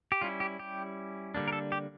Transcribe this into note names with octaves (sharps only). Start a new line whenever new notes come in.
G4
G3 C#4 E4 F4
G4
G4
D3 G3 A#3 D4
A#4
A4
G4